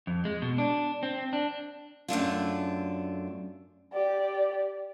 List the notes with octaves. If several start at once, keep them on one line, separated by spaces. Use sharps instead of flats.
F2
G#3
B2
D4
C4
D4
F#2 A3 D4 F4
G4 D5